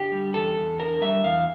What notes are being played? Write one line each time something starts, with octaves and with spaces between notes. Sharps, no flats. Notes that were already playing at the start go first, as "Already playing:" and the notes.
Already playing: D3 G4
G3
E2 A4
E2
D3 A#4
G3 E5
E2 F5